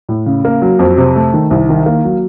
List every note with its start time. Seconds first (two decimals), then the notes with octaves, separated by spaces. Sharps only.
0.09 A2
0.26 C#3
0.45 A#3
0.62 F#3
0.79 F2
0.98 C3
1.15 A3
1.33 D#3
1.51 C2
1.69 D#3
1.86 A#3
2.04 F#3